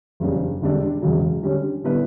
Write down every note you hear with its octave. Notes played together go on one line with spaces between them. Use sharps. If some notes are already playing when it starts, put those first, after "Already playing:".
F#1 E2 C#3 G3 D4
E1 E2 D3 G3 D4
E1 E2 C#3 F#3
D3 G3 C#4 G4
D3 G3 B3 E4 B4